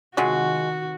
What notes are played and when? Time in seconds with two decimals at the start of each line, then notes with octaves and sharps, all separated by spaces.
0.17 C3 D#3 F3 F#3 G#3 F#4